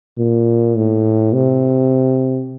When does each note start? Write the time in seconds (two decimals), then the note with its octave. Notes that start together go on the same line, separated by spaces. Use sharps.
0.19 A#2
0.77 A2
1.33 C3